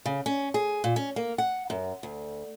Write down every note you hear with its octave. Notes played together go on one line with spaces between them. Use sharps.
C#3
C#4
G#4
A#2
C#4
A#3
F#5
F#2
D2